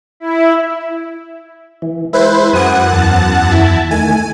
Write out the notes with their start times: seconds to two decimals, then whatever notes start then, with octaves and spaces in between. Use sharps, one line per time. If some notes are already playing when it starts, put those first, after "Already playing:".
0.20 E4
1.82 E3
2.13 G#3 E4 B4 C5
2.53 F#2 F#5 G#5 D#6
2.93 E2 A5
3.52 E4
3.91 D#3 A3 G#5